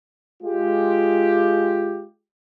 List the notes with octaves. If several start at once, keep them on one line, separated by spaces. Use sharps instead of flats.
G#3 F4 G4